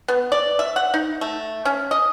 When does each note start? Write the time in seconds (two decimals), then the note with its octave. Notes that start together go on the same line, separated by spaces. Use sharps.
0.08 B3
0.32 D5
0.59 E5
0.76 F#5
0.94 D#4
1.21 A3
1.65 C#4
1.91 D#5